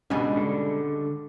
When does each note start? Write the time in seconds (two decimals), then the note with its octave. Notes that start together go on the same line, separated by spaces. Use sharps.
0.10 C#2 G#2 B2 G3 G#3 D4 G#4
0.37 D3